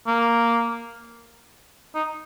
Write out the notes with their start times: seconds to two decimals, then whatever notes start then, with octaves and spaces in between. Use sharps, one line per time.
0.07 A#3
1.95 D#4